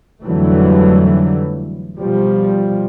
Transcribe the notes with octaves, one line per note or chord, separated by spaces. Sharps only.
F2 D3 E3 F#3 G3 A3
B2 F3 G3